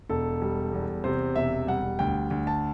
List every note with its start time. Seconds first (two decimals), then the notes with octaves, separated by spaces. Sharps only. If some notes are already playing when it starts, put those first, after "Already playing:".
0.09 E1 A4
0.42 G3
0.73 E2
1.04 C3 C5
1.36 E1 E5
1.67 G3 F#5
1.99 D2 G5
2.31 D2
2.47 A5